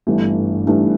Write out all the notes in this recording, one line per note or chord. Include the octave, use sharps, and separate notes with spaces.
G1 G2 E3 A3
G1 G2 E3 A3